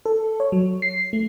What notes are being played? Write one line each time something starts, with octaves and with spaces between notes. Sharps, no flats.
A4
C#5
F#3
C7
A3